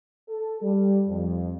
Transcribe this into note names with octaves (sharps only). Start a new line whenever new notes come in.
A4
G3
F2